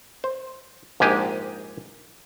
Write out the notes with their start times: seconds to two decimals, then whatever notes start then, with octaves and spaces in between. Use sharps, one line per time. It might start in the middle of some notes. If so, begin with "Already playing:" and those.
0.24 C5
1.00 A#1 G#2 G#3 G4 G#5